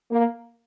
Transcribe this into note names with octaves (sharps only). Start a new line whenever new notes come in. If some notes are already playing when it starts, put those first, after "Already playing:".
A#3